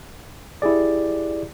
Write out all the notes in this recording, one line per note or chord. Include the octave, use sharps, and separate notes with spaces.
E4 G4 G#4 D5